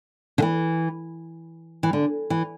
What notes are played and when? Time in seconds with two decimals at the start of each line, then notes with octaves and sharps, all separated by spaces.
0.38 D3
0.42 E3
1.83 E3
1.93 D3
2.30 E3